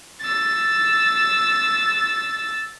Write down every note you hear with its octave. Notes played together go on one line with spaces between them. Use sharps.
E6 A6